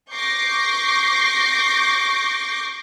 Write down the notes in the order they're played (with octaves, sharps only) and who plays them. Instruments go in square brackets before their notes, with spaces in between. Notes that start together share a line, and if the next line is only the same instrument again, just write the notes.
[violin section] C#6 D6 G6 A#6 C7